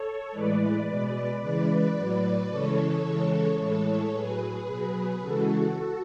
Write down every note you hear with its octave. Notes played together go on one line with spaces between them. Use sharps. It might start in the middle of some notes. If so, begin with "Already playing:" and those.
Already playing: A4 C#5
A2 E3 G#3 B4 D5
B2 G#3
C#3 E3 G#3 B4 D5
A2 F#3
C#3 E3 G#3 A4 C#5
C#3 E3 G#3
A2 E3 G#3 A4 C#5
A2 F#3 G#4 B4
B2 F#3
C#3 E3 G#3 F#4 A4